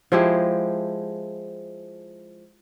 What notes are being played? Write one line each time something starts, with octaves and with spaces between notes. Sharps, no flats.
F3 G#3 E4 G4